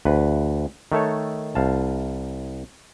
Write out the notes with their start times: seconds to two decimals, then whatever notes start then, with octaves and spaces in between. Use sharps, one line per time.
0.05 D2 B4
0.92 D#3 A3 A4 C#5
1.55 C2 F5 A5